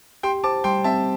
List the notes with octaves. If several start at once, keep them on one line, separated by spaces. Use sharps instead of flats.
G4 G5 C6
C5 A5 D6
G3 G5 C6
C4 E5 A5